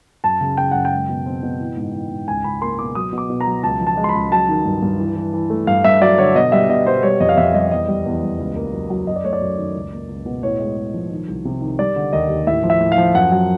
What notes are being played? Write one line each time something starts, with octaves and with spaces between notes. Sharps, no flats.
F#2 A5
C#3
C#3 G5
F#2 F#5
G5
G#3
B2
C4
B2
E3
G#2
E3
G#2
C#2 G#5
C#2 B5
A#3 C6
B2 D6
F#3 D#6
B2
D6
B2
A#5
F#3
C#2 A5
F3
A5
G#3
C6
B5
C#2
F#3 A5
D#3
G2
G2
E3
E3
E3
A3
G2 F5
G2 E5
F#3 D5
D3 C#5
B2 D#5
G3 E5
B2 D#5
B2 C5
G3 C#5
F2 D#5
F5
F2 E5
G3 D#5
E2 D#5
G3
E2
G3
C#2
A#3
F#3
F#3
F#2 D#5
D5
A3 C#5
D5
F#2
D#3
C#2
A#3
C#2
B2
A2 C#5
G#3
G#3
F3
D#3
C2
C3
D#3
G3 D5
D3
D#2 D#5
D#2
A2 E5
F3
E5
A2
F5
F3
F#2 F#5
F#3